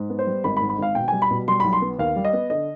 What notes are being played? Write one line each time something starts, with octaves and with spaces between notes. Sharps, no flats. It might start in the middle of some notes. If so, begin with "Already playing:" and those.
Already playing: G#2
B3
C5
G3
G#1 B5
B5
G#2
B5
G#1 F5
B2 G5
G3 G#5
B5
B2
G3 C6
B1 B5
C6
B3
D#2 F5
G3
D#5
B3
D3 D#5